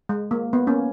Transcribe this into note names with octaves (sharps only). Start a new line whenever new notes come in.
G#3
A#3
B3
A#3 C#4